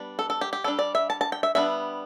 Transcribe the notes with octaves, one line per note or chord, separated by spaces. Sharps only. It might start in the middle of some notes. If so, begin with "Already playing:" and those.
Already playing: G3 B3 D4
A4
A4
G4
G4
G3 D4 A4
D5
E5
A5
A5
G5
E5
G3 B3 D4 E5